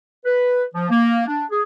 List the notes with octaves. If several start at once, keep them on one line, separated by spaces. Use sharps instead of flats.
B4
F3
A#3
D4
G#4